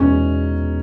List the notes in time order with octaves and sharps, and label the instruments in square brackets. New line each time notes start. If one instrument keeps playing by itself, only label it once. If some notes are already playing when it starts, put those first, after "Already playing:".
Already playing: [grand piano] E2 B2 G#3 D#4 [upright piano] C#4